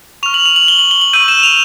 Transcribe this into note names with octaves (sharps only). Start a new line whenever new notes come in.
C#6 F6 F7
F#7
F7
F#7
G7
F#7
G7
F#7
C#6 E6 G6 D#7
E7
F7